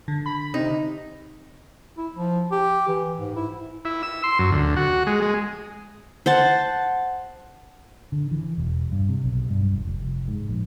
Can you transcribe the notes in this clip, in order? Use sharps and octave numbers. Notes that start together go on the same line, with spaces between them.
D3
B5
C3 D#4
E4
F3
G4
E3
G#2
E4
E4
E6
C6
F#2
D2
F#4
G#3
G#3
C5 F#5 A5
D3
E3
E1
G2
C3
B1
G2
F1
F1
G#2
A#1